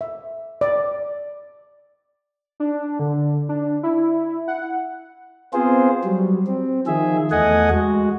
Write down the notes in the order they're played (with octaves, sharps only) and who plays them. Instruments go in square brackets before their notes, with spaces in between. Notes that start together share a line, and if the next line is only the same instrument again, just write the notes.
[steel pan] E5
D5
[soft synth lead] D4
D3
D4
E4
F#5
[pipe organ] B3 C4 F4 G#4 C5
F#3 G3
C4
D#3 F3 G#4 E5
E2 A3 D#5 F#5 G#5
G#3 F#4